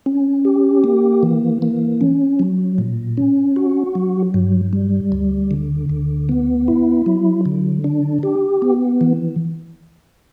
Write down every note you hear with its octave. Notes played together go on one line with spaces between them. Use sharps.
C#4
G4
A#3
E3
A#3
C#4
F#3
A#2
C#4
F#4
F#3
G2
G3
D2
D3
D2
B3
E4
F#3
D3
D4
G4
B3
E3